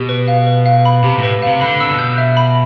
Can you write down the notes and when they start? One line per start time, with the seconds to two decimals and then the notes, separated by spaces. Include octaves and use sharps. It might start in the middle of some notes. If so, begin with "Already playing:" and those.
Already playing: B2 G4
0.09 B4
0.28 F5
0.47 B4
0.66 F5
0.85 B5
1.04 C3 G4
1.18 A2
1.23 B4
1.42 C3 F5
1.61 D3 B5
1.80 C3 E6
1.89 B2
1.99 G6
2.18 E5
2.37 B5